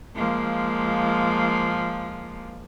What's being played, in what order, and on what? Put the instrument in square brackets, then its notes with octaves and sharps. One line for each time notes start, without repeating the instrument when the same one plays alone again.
[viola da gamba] F3 G#3 A#3